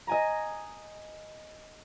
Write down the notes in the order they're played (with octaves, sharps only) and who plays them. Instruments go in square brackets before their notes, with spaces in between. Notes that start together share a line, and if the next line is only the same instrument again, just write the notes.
[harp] D#5 G#5 A#5